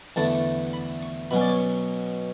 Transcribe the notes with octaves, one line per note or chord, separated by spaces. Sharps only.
E2 D3 A3 E4 A5
C#6
B5
C#6
B2 F#3 C#4 B5
D5
C#5